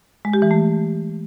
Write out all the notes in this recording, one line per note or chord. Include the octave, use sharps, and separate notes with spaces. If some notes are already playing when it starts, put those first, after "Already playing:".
G#3
G4
E3
A3